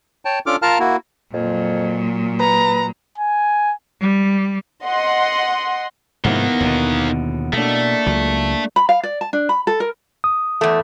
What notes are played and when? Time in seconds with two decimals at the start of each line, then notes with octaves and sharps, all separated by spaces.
0.25 C#5 G5 A5
0.46 C#4 D4 F4 A4 D6 F6
0.62 F4 A#4 F5 A5 A#5 F6
0.80 A#3 E4 F#4
1.33 F2 A#2 F#3
2.40 B4 A#5
3.18 G#5
4.01 G3
4.85 D#5 F#5 C6
6.24 G#2 C3 D#3 F3 A#3 B3 D#4 E4
6.60 D#2 B2 D3
7.53 B2 A3 A#3 D4
8.06 C#2 F#3
8.76 B5
8.89 F5
9.03 D5
9.21 A5
9.33 D4
9.49 B5
9.67 A4
9.80 A#4
10.24 D#6
10.61 E2 A3